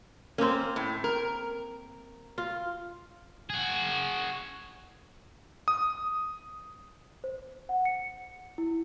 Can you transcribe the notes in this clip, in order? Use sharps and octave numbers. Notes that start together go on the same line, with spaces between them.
A#3 C4 C#4 C5
A2
A#4
F4
F#4 G#4
D#6
C5
F#5
C#7
E4